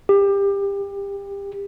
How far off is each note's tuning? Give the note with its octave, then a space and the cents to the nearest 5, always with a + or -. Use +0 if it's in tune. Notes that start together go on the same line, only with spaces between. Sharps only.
G4 +25